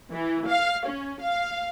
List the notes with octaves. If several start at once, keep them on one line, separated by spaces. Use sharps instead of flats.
E3
F5
C#4
F5